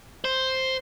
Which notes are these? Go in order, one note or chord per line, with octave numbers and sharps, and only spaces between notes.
C5